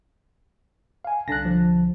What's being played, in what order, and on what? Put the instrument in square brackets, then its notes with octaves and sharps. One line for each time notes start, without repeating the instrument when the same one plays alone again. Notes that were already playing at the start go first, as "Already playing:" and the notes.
[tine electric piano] F5 G#5
[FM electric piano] C2 D3 A5 [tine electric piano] F#6 A#6
[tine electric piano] F3